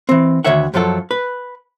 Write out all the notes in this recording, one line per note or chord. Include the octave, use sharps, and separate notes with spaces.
E3 C4
D2 D#3 C#5 E5 F#5
F#2 F3 F#3 F4 A4
B4